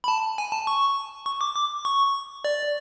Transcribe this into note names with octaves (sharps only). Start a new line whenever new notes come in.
B5
A5
G#5
A5
C#6
C#6
D6
D6
C#6
D5